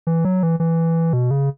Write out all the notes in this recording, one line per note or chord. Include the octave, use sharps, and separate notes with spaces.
E3
F#3
E3
E3
B2
C#3